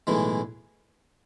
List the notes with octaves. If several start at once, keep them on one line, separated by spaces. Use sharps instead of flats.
B1 A2 E3 G#3